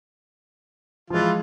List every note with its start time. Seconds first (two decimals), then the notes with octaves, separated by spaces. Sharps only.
1.10 E3 F3 G#3 F4